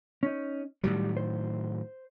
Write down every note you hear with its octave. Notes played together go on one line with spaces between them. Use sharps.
C#4 D#4
A2 D#3 F#3 G3
C5